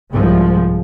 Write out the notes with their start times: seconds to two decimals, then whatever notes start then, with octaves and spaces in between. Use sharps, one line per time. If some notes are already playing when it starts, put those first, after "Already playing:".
0.11 C2 G#2 C3 F3 G#3